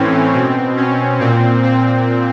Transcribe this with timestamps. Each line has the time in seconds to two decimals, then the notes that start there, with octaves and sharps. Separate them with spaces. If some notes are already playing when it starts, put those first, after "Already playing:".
Already playing: A2 E3 C4 C#4
0.33 B2 C4
0.76 C#4
1.20 A#2 C4
1.63 C4